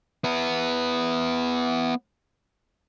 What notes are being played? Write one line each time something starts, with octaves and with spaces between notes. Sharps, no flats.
B3 E4